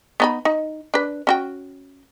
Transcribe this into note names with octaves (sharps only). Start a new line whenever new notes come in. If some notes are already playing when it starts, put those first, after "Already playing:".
B3 D#4 B5
D#4
D4 B4
C#4 F#4 G5